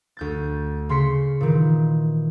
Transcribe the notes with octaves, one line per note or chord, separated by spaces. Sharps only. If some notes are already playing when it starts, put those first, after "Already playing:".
D2 G6 A6
C#3 C6 B6 C#7
A#2 D#3 E3